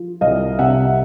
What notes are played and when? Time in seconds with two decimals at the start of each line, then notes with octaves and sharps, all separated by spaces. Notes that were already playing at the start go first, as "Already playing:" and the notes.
Already playing: F3
0.21 C2 D#5 F5
0.59 C3 E5 F#5